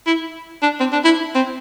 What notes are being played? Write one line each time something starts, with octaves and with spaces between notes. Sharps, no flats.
E4
D4
C4
D4
E4
C4